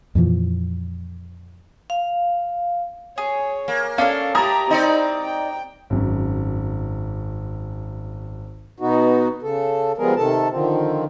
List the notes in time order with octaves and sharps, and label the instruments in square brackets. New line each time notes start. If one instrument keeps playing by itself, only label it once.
[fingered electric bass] F2 A#2 E3 F3
[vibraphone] F5
[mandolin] G#4 [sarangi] C#5
[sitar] A#3
[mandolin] C#4 D4 A4 [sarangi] C#5 [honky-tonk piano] F5
[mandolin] E4 A5 [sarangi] G4 [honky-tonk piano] A#5 D#6
[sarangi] C4 [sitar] D#4 D5
[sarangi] G5
[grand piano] G#1 F#2
[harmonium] B2 B3 D#4 F#4
C#3 A4
F3 G3 G#3 B3 G#4 A#4
C3 D#3 A4 A5
D3 D#3 F3 C4